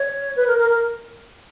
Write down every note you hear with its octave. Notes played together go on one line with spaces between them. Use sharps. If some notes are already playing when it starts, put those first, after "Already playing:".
Already playing: C#5
B4
A#4
A#4
A#4